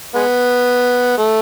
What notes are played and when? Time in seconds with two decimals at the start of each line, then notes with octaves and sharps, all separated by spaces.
0.15 G#3 B3
1.18 A3